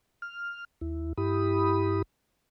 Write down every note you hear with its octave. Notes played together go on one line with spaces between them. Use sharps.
F6
D#2 E4
G2 E4 G4 B5 D#6